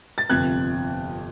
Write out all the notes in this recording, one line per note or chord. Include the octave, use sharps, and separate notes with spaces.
A6
G1 F2 C3 F#6 G#6